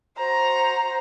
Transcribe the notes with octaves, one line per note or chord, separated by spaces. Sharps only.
F#4 C5 A#5